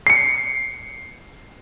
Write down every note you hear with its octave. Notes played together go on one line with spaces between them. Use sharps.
C7 C#7